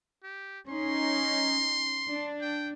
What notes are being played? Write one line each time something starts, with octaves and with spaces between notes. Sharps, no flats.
G4
C#4 D#4 C6
D4
G5